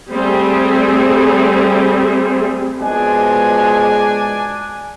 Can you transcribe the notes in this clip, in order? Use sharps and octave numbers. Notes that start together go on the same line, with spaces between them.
G3 A3 C4 G#4
B2 F3 G#3 D4 G#5